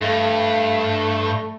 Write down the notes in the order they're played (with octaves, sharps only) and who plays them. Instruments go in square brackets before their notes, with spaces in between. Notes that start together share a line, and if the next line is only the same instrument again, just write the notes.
[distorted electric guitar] G2 [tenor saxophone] A3